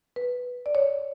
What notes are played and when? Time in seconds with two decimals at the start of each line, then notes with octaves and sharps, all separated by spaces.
0.16 B4
0.66 D5
0.75 C#5